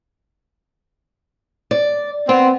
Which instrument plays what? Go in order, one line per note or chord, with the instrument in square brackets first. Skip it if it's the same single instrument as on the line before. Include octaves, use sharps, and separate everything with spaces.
[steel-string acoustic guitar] D5
[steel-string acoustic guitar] B3 [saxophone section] C4